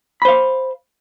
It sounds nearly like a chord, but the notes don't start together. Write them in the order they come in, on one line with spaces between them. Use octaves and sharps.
B5 C5 F5